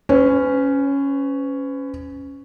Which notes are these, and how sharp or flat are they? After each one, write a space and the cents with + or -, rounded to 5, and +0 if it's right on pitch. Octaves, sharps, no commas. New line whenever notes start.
C#4 +0 B4 +40